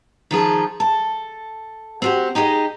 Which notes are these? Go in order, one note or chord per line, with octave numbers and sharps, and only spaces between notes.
D#3 F3 G#4 A4
A4
C4 F#4 G4
D#4 G4 G#4 D5 D#5